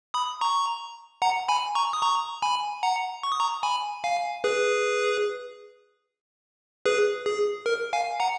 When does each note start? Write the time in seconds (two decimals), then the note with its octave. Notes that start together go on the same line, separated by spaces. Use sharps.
0.14 B5 D#6
0.41 A#5 C#6
1.22 F#5 A#5
1.48 G#5 B5
1.75 A#5 C#6
1.93 D#6
2.02 A#5 C#6
2.42 G#5 B5
2.83 F#5 A#5
3.23 C#6
3.32 D#6
3.40 A#5 C#6
3.63 G#5 B5
4.04 F5 G#5
4.44 G#4 B4
6.86 G#4 B4
7.26 G#4
7.66 A#4
7.93 F5 G#5
8.20 F#5 A#5